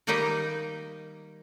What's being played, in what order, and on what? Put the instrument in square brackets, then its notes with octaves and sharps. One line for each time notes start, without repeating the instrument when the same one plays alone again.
[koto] D#3 G3 A#3 D#4 G4 D#5